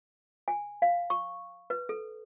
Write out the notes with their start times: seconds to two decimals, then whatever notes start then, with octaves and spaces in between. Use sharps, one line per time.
0.48 G#5
0.82 F5
1.10 C#6
1.70 B4
1.89 A4